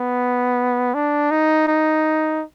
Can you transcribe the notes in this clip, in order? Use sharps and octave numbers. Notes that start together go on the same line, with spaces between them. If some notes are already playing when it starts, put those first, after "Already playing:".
Already playing: B3
D4
D#4
D#4